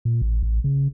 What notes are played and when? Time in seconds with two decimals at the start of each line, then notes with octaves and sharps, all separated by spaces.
0.05 A#2
0.22 A1
0.43 A1
0.64 C#3